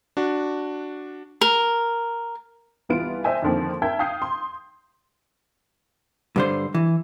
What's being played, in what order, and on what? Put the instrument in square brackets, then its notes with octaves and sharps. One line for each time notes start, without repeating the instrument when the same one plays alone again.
[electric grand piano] D4 F#4
[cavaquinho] A#4
[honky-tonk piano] C2 E3 B3 F4 D7
C5 D#5 E5 G5 G#5
F2 D3 D#3 F3 A#3 C4
A#4 E5 G5 A5 G#6
F5 G5 D#6 G6 C7
C6
[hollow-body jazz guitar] G2 D3 C5
E3